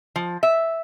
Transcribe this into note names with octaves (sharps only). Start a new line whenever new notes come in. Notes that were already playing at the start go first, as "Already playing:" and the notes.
F3
E5